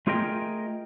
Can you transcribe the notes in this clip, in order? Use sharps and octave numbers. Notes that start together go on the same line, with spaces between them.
A3 F4 G#4 A#4 D#5 G5